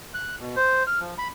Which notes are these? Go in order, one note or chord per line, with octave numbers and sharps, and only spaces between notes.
F#6
B2
C5
F6
F3
B5